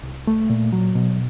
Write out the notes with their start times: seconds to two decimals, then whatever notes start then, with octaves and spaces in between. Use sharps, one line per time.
0.03 C2
0.27 A3
0.50 A#2
0.73 F#3
0.95 B2